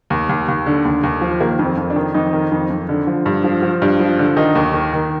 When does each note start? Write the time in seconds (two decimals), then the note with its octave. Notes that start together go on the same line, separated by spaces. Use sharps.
0.10 D#2
0.29 D#2
0.48 D#2
0.66 D3
0.85 D#2
1.03 D#2
1.22 F3
1.40 D#3 A#3
1.59 F2
1.64 C4
1.77 F2
1.90 D4
1.96 D#3
2.14 F2 D#4
2.33 D#3
2.52 F2
2.70 F2
2.89 D3
3.07 F3
3.26 G2
3.44 F3
3.63 F3
3.82 G2
4.00 F3
4.19 D3
4.36 D#3 D#4
4.55 D#2
4.74 D#3
4.93 D#3